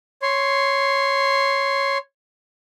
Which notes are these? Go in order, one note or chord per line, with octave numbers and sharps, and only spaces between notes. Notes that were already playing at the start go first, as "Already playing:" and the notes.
C#5 C6